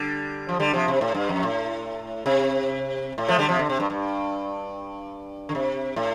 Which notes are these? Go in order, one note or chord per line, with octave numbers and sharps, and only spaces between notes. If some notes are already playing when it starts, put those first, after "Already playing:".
Already playing: D3 G3
F3
D3 G3
C3 F3
C3
A2
G2
F2
A2
C3
A2
F3 A3
D3 G3
C3 F3
D3
C3
G2
G2
D3
C3
A2